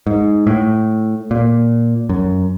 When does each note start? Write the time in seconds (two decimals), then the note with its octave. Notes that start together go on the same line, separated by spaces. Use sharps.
0.07 G#2
0.47 A2
1.31 A#2
2.09 F#2